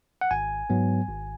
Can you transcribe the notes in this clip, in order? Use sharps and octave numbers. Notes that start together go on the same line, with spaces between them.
F#5
G#1 G#5
G#2 F#3 B3
G#1